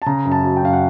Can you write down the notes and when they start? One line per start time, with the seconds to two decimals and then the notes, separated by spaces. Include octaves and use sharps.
0.02 A5
0.06 C#3 A#5
0.25 F#2
0.32 A5
0.44 F#3
0.57 G5
0.62 F#2 F5
0.73 F#5